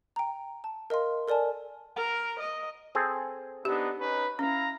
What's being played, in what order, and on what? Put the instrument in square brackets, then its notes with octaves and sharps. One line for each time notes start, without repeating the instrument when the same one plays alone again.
[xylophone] G5 A#5
A5
A#4 D#5 F5 C6
A4 A#4 D5 G#5 A5
[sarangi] A#4
D#5
[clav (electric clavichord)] C4 G#4 A4
[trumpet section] B3 D4 D#4 [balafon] G4
[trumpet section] C#4 D#4 B4
[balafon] C#4 [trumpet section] E4 F5 A#5